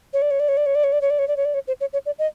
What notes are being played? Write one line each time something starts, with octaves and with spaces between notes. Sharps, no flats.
C#5
D5
C#5
D5
C#5
D5
C#5
D5
C#5
D5
C#5
D5
C#5
D5
C#5
D5
C#5
C5
C#5
C#5
D5
D#5